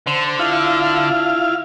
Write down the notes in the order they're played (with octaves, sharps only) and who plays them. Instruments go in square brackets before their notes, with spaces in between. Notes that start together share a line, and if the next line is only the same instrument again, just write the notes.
[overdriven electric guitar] D3 [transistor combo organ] C5
[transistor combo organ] E4 F4 F5